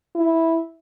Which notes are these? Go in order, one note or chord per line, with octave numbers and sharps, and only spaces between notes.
E4